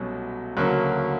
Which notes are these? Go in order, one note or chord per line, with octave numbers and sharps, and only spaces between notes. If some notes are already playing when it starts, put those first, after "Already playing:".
Already playing: C2 B2 F#3 A3 C#4
D2 C#3 F#3 A#3